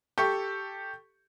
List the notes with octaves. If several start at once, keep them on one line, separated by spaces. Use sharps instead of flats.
G4 A4 C#6